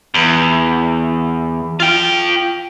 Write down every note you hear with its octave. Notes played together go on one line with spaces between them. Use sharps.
E2
F4 G5